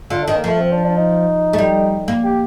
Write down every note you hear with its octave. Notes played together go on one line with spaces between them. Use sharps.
D3 F4
D#3 D4
A#3
F3 A3
C4
D4
D4
D#4
A3
G3
A#3
G4